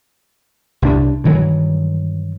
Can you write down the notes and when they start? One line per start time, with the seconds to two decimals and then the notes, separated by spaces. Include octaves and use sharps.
0.82 C2 D4
1.24 G2 D#3 E3 F#3